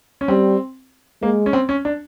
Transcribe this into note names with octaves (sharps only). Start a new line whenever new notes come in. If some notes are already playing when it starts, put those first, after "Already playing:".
C#4
G3 C4
G#3 A#3
C#4
C4
C#4
D4